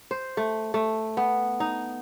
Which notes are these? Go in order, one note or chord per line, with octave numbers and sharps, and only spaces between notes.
C5
A3
A3
B3
D#4